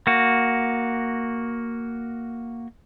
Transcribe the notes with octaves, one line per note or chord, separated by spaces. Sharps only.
A#3 F#4